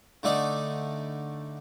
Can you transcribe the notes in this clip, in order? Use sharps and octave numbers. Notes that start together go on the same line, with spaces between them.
D3 A3 D#4 D5